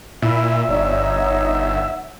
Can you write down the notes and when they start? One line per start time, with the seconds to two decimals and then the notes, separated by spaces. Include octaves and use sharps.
0.22 A#2 E4 E5
0.69 G1 D#4 C#5 D5
1.20 F#5